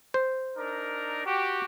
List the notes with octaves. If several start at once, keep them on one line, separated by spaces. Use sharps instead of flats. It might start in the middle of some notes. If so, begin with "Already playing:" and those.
C5
D4 D#4 A#4
F#4 G4